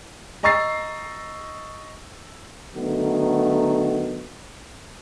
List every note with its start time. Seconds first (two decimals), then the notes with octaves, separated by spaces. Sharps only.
0.43 D#5 A#5 C#6 E6 A6 C7
2.76 D3 D#3 F#3 A3 B3